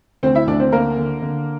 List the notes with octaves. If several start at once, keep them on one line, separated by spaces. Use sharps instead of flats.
D2 C4 C5
E4 E5
D2 D4 D5
C4 C5
D3 A#3 A#4
D3
D3